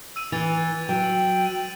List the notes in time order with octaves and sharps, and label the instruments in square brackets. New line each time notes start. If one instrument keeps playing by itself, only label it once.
[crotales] E6 D#7
[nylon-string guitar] E3 [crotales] E6 A6 F7
[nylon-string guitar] F#3 [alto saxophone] G5
[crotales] F#7
D#7